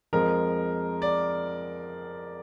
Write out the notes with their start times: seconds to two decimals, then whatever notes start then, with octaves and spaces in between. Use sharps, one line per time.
0.13 F2 F3 G#3 A#4
1.02 D5